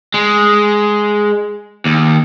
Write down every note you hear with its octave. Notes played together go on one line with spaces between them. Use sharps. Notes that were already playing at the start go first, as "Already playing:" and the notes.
G#3
D#2